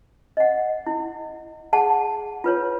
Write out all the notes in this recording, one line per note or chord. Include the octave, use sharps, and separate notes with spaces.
D#5 F#5
E4
G#4 F#5 A5
F4 B4 C#5